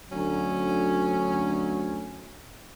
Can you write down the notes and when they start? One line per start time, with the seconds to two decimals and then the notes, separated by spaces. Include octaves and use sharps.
0.12 D2 F#3 C#4